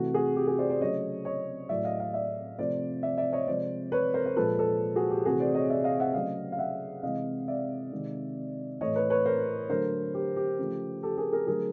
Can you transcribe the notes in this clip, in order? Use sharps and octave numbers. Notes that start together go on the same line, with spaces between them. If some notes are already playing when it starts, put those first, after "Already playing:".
Already playing: C3 E3 A3 F#4
F#4 G#4
G4
F#4 G#4
C5 D5
C5 D5
C#3 F#3 A3 C#5 D#5
C#5 D#5
A2 F#3 A3 D5 E5
D#5 F5
D#5 F5
D5 E5
C3 F3 A3 C5 D5
D5 E5
D5 E5
C#5 D#5
C3 F3 G#3 C5 D5
B4 C#5
A#4 C5
C5
A#2 F3 G#3 A4 B4
A4 B4
F#4 G#4
G4
C3 E3 A3 F#4 G#4
C5 D5
C#5 D#5
D5 E5
D#5 F5
E5 F#5
C#3 F#3 A3 D#5 F5
F5
E5 F#5
C3 E3 G#3 D#5 F5
D5 E5
C3 D#3 G#3
A2 E3 A3 C#5 D#5
B4 C#5
B4 C#5
A#4 C5
D3 F#3 A3 A#4 C5
G4
G4
C#3 F3 A3
G4 A4
G#4 A#4
G#4 A#4
D3 F#3 A3 G#4 A#4